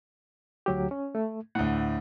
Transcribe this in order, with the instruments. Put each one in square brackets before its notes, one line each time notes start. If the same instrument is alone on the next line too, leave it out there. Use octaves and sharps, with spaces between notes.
[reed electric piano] D2 F#3 G4
C#4
A3
[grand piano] D2 A2 [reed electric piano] F#5